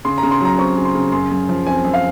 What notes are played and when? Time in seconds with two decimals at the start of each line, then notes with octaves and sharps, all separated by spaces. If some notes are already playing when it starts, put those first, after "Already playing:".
0.05 C#3 C6
0.18 A#5
0.23 C#3
0.31 C6
0.41 F#3 A#5
0.58 C4 C#6
0.77 C#3
0.85 C6
0.95 C#3
1.12 F#2 C6
1.31 F#2
1.49 F3
1.66 C4 G#5
1.84 F#2
1.94 F5